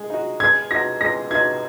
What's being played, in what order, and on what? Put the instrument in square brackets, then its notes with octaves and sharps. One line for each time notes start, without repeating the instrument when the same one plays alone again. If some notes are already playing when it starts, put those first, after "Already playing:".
Already playing: [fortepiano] G#3
D#4 F#4
[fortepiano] G#3 [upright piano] G#6
[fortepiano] D#4 F#4 [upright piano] A#6
[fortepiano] G#3 [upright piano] A#6
[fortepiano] D#4 F#4 [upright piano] G#6